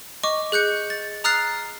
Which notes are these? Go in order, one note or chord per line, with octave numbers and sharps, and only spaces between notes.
D#5 C#6 D6
G#4 F#6 G6 C#7
A6
A#5 D#6 F6 F#6 A6 C7